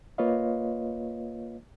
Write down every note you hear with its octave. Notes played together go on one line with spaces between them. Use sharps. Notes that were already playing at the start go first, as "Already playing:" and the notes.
A#3 F4 B4 C#5 D#5 F5